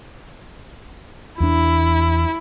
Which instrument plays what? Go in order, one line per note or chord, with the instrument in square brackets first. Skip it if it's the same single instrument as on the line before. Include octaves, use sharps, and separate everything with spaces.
[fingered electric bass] E2 D4 [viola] E4